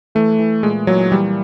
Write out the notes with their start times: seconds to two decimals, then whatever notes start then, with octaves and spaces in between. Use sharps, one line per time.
0.15 E3 A3
0.39 E3
0.63 A#2 G#3
0.87 A#2 F#3
1.12 E3 G3